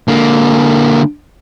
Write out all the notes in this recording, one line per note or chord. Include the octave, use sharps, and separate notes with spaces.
D3 A#3